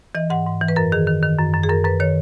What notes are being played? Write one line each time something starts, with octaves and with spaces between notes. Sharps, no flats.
E3 D#5
G#2 F#5
G#2
E3
B4
F#2 A#4
D#3 G#4
D#3
D#3
F#2
F#2
G#4
F#2 A#4
F#2 B4
D#3 C#5